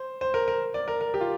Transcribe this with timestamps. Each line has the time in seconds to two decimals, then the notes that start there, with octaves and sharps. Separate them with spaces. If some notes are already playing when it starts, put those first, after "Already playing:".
Already playing: C5
0.21 C5
0.34 A#4
0.48 A#4
0.74 D5
0.88 A#4
1.01 A#4
1.14 G4
1.21 F4